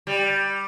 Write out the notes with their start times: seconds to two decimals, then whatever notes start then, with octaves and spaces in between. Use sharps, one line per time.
0.07 G3